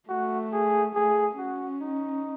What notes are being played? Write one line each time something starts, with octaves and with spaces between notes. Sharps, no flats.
A3 F#4
G#4
A3 G#4
C#4 F#4
D#4